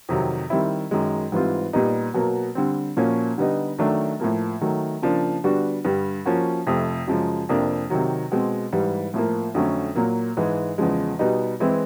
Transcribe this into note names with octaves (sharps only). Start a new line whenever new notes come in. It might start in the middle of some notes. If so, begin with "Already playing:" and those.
F2 C3 D#3 F#3
D#3 G3 C4 E4
F#2 D#3 G#3
G#2 E3 G3 C4 F4
A#2 G3 B3 D#4
B2 F#3 A#3
D3 G3 C4
A#2 F3 A#3 C#4 F#4
D3 G3 B3 D#4
D#3 F#3 A3 D4
A2 F3 A#3
D#3 F#3 A3
C#3 F3 A#3 D4
D3 G3 B3 D4 F#4
G2 D3 G3
F3 A#3 C#4 F#4
F2 C3 F3 A3
F#2 C#3 F3 G#3
F2 C3 F3 A#3 D4
C3 D#3 F#3
B2 G#3 C4
G#2 E3 G3
A2 F3 A#3
F2 D3 F#3 A3 C#4
A#2 F#3 A#3
G#2 E3 G#3
E2 C#3 F3 G#3
B2 G3 B3 D#4
E3 G#3 C4 E4